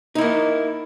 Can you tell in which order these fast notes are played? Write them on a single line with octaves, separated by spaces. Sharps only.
D#4 E4 A#3